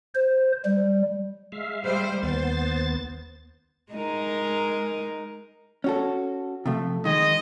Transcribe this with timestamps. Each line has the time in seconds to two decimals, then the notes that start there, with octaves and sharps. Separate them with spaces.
0.15 C5
0.65 G3
1.52 G#3 E5 F5
1.84 G3 C5
2.23 D#2 B3 C5 A6
3.93 G#3 D#4 A#4
5.84 C#4 F#4 A4
6.66 C3 F3 A3
7.05 D#3 G#3 D#5